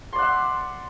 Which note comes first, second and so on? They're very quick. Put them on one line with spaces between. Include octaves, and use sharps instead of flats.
C6 D5 F#5 E5